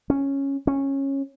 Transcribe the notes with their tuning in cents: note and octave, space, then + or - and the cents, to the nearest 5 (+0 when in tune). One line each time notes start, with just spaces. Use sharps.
C#4 -5
C#4 -15